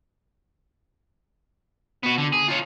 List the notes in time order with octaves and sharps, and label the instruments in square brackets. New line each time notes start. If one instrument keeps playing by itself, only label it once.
[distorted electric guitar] B3 F#4
D3
G#4
F4 C#5